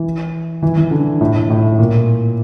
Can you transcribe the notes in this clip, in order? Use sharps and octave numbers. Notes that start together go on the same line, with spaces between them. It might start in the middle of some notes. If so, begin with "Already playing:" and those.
Already playing: E3
E3
E3
D3
A2
A2
A2
A#2